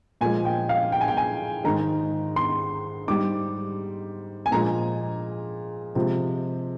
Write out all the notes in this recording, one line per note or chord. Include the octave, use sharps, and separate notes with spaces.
A#2 F3 G#3 G#5
G5
F5
G5
G#5
G5
G#5
G#2 D#3 G#3 A#5
C6
G#2 G3 D6
G#5
A#2 F3 G#3 A#5
C3 F3 G#3